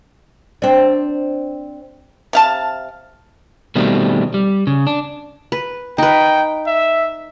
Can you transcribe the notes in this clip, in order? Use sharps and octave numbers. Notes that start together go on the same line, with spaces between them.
C4 D4
C3 F5 A5
B2 D#3 G3 A3 C4
G3
C#3
D4
B4
D#4 B4 G5
E5